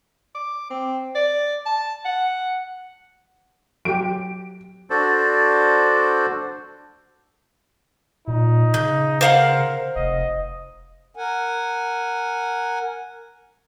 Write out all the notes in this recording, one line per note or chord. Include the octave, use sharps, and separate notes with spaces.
D6
C4
D5
A5
F#5
F#3 G4 D7
D4 F#4 A4 C5 D5
A#2 D#4
C#3 G6
A#4 C5 F5 F#5
F1 D#5
A#4 F#5 G#5